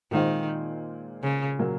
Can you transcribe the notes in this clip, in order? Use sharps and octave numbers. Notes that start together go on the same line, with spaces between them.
A#2 D#3 G#3 C4 F4 C5
C#3
A#2 F#3 A#3